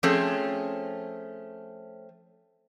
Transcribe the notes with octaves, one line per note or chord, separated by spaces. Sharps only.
F3 A3 C4 C#4 G#4 A4